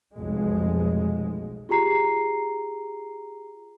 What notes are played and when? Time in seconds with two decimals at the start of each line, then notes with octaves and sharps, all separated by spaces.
0.15 F1 B1 B2 F3 G#3
1.69 F4 G4 G#4 A#5 C7